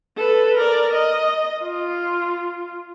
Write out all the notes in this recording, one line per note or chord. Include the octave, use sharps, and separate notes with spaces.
A4 B4
A#4 D5
D#5
F4